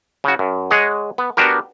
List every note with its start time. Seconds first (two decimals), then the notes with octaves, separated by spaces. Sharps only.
0.24 C#3 F#4
0.39 F#2
0.71 G#3 G#4 C#5 D#5 F#5
1.18 B3
1.37 B3 D4 F#4 G4 A#4